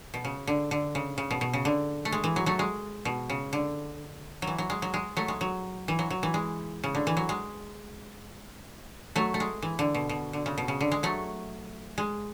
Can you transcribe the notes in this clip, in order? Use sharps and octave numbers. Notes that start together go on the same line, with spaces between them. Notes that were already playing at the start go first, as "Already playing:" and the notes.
B2
C#3
D3
D3
C#3
C#3
B2
B2
C#3
D3
A3
G#3
E3
F#3
F#3 A3
G#3
B2
C#3
D3
F#3
E3
F#3
G#3
F#3
G#3
F#3 A3
G#3
F#3
E3
F#3
F#3
E3
G#3
C#3
D3
E3
F#3
G#3
F#3 A3
A3
G#3
E3
D3
B2
B2
D3
C#3
B2
C#3
D3
G#3
F#3 A3
G#3